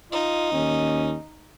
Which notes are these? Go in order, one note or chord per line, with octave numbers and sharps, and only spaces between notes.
D#4 F4 D#5
D#2 C#4